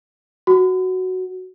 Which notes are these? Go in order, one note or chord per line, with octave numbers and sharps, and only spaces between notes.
F#4